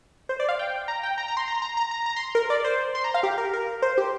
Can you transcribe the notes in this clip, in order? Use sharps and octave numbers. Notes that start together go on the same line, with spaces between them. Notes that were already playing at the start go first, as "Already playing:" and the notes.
C5
D5
F5
G5
A#5
G5
A#5
A#5
C6
A#5
A#5
A#5
A#5
A#5
C6
A#4
D5
C5
C6
A#5
F5
G4
A#4
A#4
C5
G4